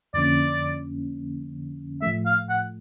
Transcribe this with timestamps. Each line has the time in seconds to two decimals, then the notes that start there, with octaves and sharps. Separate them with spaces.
0.14 F2 D3 F3 A#3 C#4 D5
2.02 A2 F3 A3 E5
2.26 F5
2.49 F#5